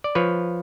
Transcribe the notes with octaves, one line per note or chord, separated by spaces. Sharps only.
D5
F3 B4 C#5